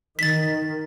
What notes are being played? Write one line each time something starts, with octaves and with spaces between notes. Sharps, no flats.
D#3 A6 B6